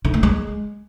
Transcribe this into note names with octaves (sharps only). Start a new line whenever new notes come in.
D3
A3
G#3